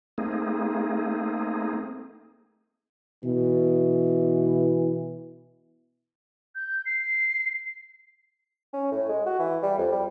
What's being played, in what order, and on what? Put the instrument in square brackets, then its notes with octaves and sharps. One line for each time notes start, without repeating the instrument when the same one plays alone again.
[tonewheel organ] A3 A#3 C4 D#4 G#4
[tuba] B2 [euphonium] E3
[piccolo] G6
C7
[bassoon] C#4
A2
G#3
F#4
E3
G3
F2
G3